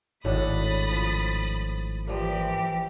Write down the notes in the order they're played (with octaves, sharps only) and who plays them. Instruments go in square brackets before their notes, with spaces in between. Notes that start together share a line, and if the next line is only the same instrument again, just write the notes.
[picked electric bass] G#1 [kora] A2 D4 F#4 [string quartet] B5 D#6 A6
[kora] F3 F5
[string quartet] E3 G4 [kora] F3 G3 A#3